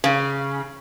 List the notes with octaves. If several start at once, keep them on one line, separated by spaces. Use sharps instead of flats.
C#3